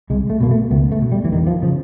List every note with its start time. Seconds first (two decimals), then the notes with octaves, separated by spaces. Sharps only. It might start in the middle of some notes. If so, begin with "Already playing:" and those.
0.10 C2 G#3
0.30 A3
0.41 B2 A#3
0.51 A3
0.71 C#2 B3
0.92 A3
1.02 B2
1.12 G3
1.25 E3
1.32 E2 D#3
1.47 F3
1.63 C#3 F3